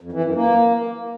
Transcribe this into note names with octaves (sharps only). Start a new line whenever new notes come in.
F2
E3
F#2
A#3